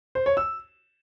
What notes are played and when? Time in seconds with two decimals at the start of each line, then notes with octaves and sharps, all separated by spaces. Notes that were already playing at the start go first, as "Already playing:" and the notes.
0.15 C5
0.26 C#5
0.37 E6